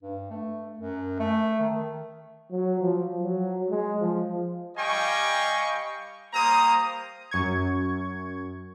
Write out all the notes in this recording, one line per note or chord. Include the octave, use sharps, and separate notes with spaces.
G2
A3
F#2
A3
D#3
F#3
F3
F#3
G#3
F3
G3 D#5 F5 G5 G#5 C#6
G3 A#3 C5 A#5 D#6
F#2 C#6 G#6